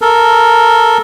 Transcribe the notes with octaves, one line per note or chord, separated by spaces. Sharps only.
A4 A#4